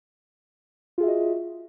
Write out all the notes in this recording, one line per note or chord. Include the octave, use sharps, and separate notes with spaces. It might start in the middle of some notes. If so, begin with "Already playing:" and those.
F4 F#4 G#4 D#5 E5